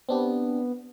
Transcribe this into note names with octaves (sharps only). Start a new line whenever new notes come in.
B3 C4 D4 G4